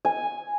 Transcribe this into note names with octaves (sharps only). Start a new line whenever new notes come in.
G#5